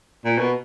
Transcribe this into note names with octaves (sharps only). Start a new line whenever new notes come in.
A#2
B2